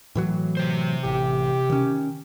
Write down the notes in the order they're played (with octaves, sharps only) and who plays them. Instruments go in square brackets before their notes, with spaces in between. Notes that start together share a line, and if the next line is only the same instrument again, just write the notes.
[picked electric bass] A2 E3 F#3
[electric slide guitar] C3 C5
[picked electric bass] A1 [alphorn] G4
[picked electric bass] D#3 C#4